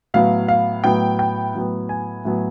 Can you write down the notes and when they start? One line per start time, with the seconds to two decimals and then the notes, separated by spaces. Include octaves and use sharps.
0.14 A2 F#3 B3 F5
0.48 F5
0.84 A2 F#3 B3 G5
1.19 G5
1.55 A2 F#3 B3
1.89 G#5
2.25 A2 F#3 B3